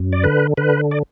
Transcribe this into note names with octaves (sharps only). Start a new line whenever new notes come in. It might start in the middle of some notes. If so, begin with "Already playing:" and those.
Already playing: F#2
D5
D3 B4
D3 B4
D5